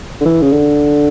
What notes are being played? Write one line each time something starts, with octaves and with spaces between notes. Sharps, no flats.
D3
E3
C#3
D3